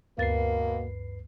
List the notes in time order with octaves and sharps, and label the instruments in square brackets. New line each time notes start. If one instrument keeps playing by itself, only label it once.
[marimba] D2 A6 [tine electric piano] G2 B4 C7 [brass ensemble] B2 A#4 [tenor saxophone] A#3